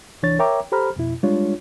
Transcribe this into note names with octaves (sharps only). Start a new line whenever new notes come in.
C2 E3 D4 C#5 A6
A#4 C#5 E5 G5 A#5 D6
G4 A4 C5 A#5 B5 F6
F2 B2 E4
G3 G#3 D4 F4 C#5